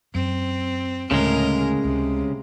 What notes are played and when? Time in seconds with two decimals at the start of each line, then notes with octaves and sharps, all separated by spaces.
0.15 F#2 C4
1.11 D2 A2 C#3 G#3 A#4
1.85 C#2 C3